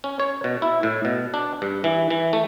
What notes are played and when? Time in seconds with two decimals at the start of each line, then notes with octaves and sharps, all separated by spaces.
0.04 C#4
0.20 C#5
0.44 B2
0.62 E4
0.83 A2
1.05 B2
1.34 D4
1.62 G2
1.84 E3
2.10 E3
2.33 A3